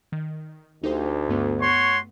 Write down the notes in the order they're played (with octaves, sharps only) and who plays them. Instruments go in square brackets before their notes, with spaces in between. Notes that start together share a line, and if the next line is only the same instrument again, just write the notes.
[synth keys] D#3
[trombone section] D2 [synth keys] D#4 G4 C5
[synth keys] G2 A3 B3
[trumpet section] F#4 C#5 C6